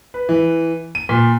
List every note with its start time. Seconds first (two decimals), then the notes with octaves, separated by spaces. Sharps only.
0.14 B4
0.29 E3
0.95 D#7
1.09 A#2